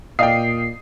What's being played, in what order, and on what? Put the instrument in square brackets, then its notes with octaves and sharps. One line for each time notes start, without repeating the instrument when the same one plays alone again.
[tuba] A#2 [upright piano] D5 D#5 D#6 [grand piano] F5 G5 [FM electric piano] C7